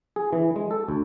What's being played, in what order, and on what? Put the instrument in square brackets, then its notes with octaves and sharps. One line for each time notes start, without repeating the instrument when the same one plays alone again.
[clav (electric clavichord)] G#4
E3
G#3
A4
D2